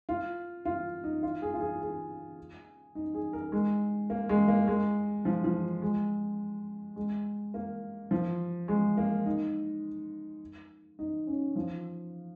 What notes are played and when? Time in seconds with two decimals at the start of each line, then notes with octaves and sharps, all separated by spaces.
0.09 F4
0.65 F4
1.04 D#4
1.23 F4
1.42 G#4
1.54 F4
1.61 G#4
1.81 G#4
2.95 D#4
3.14 G#4
3.33 A#4
3.52 G#3
4.10 A#3
4.29 G#3
4.48 A#3
4.67 G#3
5.25 F3
5.44 F3
5.82 G#3
6.96 G#3
7.54 A#3
8.11 F3
8.68 G#3
8.97 A#3
9.26 D#4
10.99 D#4
11.27 C#4
11.56 F3